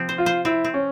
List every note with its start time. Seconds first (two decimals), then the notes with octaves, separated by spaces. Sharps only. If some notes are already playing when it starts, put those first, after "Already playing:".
Already playing: C3 F3 C4
0.09 C5
0.18 F4
0.26 C5
0.45 C4 E4
0.65 C4
0.74 C#4